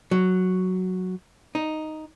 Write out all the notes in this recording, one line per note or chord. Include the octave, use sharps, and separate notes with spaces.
F#3
D#4